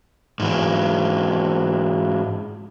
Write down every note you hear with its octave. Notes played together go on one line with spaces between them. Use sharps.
G#2 E3